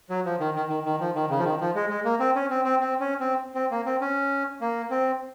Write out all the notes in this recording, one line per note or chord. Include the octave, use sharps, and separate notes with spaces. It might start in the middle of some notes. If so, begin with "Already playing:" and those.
F#3
F3
D#3
D#3
D#3
D#3
F3
D#3
C#3
F3
D#3
F3
G#3
G#3
A#3
C4
C#4
C4
C4
C4
C#4
C4
C4
A#3
C4
C#4
A#3
C4